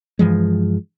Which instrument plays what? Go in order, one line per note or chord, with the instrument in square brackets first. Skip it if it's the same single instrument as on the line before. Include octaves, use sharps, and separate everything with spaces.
[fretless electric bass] G2 E3 F3 G#3